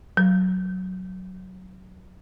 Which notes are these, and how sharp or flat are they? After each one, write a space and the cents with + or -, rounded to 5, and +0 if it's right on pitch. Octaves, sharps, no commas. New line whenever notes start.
F#3 +0